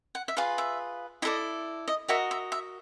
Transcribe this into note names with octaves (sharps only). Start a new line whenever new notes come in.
F#5
E5
F4 G#4 B4 F5
E5
E4 A4 D5 D#5
D#5
F#4 A#4 D#5 E5
E5
E5